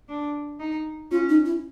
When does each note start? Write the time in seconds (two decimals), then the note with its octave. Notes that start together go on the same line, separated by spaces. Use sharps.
0.09 D4
0.60 D#4
1.11 C#4 F4
1.29 D#4
1.45 E4